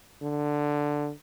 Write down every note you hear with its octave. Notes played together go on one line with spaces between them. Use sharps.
D3